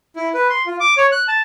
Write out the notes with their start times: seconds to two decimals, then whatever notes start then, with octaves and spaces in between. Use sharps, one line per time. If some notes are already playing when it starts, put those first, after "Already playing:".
0.16 E4
0.34 B4
0.50 C6
0.66 F4
0.80 D6
0.97 C#5
1.12 F#6
1.28 A5